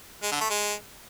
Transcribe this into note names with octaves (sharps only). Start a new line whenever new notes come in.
G#3
D3
A3
G#3